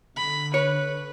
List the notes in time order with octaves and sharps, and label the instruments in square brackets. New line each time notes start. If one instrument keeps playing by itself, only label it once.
[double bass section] D3 [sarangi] B5
[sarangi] B4 [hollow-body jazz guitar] C#5